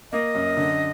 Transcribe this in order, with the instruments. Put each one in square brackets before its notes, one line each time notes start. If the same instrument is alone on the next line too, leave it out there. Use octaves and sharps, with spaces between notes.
[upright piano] A#3 [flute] D#5
[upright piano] F#2
D3